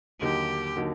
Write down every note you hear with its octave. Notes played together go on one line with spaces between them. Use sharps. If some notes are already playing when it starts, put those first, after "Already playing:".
D#2 D3 F#3 A#3 D#4 G4
D3 F#3 A#3 D#4